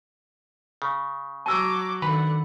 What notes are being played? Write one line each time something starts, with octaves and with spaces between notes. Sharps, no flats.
C#3
F#3 A5 D6 E6
D3 D#3 B4 F#5 B5